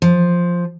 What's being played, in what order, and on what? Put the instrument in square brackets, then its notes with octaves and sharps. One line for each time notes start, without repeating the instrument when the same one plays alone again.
[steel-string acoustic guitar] F3